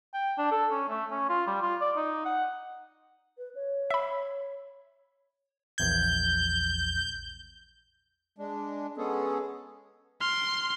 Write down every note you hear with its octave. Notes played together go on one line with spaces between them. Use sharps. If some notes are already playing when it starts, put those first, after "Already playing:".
G5
D4
A4
C#4
A3
C#4
F4
G3
F4
D5
D#4
F#5
B4
C#5
E5 B5
A#1 E2 G6 G#6
G#3 D4
G#3 B3 C#4 G#4 A4
C6 F6 F7